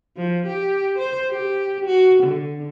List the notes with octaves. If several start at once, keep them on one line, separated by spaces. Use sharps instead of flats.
F3
G4
C5
G4
F#4
D3